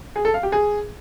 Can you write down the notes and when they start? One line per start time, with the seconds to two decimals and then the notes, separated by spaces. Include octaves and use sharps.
0.16 G#4
0.25 A4
0.34 F5
0.43 G4
0.52 G#4